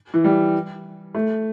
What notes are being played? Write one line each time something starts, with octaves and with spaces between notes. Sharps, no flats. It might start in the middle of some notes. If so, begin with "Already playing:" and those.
E3
G3
A3